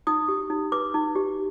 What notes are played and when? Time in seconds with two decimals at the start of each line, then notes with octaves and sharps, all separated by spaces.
0.07 D#4 D#6
0.28 G4
0.50 D#4
0.72 B4 D6
0.94 D#4
1.15 G4